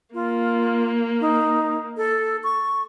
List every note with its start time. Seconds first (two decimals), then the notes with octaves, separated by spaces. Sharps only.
0.14 A#3 F4
1.21 D#4
1.97 A4
2.44 C#6